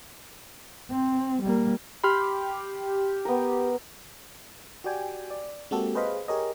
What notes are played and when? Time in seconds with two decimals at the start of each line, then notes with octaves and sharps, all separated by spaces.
0.90 C4
1.43 G3 A#3
2.04 G4 B5 C6 F6
3.25 B3 A#4
4.84 F#4 G4 D5 G5 G#5
5.30 D5
5.71 G#3 A#3 C4 F#4 G4 A4
5.95 G#4 B4 C5 D#5 F5 B5
6.28 G4 G#4 A#4 C#5 D#5